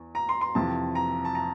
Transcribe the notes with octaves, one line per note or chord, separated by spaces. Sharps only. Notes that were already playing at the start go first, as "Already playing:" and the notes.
Already playing: E2
A#5
C6
C6
F2 C3 E3 A5
A#5
A5
A#5